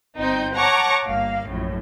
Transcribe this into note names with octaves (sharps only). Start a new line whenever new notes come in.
G1 C4 D#4 G6
C#5 F#5 A5 A#5 C#6 D6
G1 A#3 F5
A#1 F#2 A2